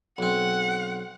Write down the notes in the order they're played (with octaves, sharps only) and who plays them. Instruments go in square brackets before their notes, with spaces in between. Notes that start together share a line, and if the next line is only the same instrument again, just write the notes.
[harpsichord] B1 C4 [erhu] F#5